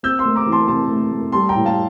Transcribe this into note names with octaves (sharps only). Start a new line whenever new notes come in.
C4 E6 G6
C6 E6
A3
A#5 D6
E3
A5 C6
C3 A5 C6
A3
A3
G3 A5 C6
G5 A#5
A2
F5 A5